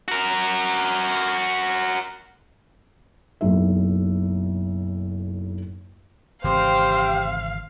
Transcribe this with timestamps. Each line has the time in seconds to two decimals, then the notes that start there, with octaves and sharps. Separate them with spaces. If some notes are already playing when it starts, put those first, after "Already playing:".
0.08 F#4 A#4
3.41 F#1 B1 E5
6.44 G#1 C#3 E3 C4 G4 C5 F5 G5